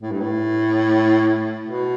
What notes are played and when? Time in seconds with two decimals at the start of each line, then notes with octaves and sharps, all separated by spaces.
0.02 A2
0.11 G2
0.21 A2
1.66 B2